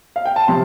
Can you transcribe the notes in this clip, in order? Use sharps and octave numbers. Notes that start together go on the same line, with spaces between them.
F5
G5
A5
C3 F3 C6